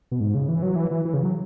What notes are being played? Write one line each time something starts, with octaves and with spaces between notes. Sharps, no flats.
B2
G#2
C#3
E3
F#3
E3
E3
E3
C#3
F#3